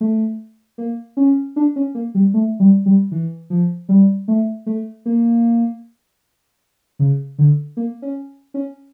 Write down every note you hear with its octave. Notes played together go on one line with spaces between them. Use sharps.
A3
A#3
C#4
D4
C#4
A#3
G3
A3
G3
G3
E3
F3
G3
A3
A3
A#3
C#3
D3
A#3
C#4
C#4